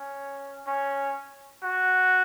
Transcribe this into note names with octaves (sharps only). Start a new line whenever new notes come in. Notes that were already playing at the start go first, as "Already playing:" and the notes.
Already playing: C#4
C#4
F#4